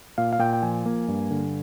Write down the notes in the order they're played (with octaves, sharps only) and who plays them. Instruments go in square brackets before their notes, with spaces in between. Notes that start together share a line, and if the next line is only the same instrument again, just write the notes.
[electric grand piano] A#2 F5
F5
A#2 G5
G5
F3 G#5
A#3
G2
D3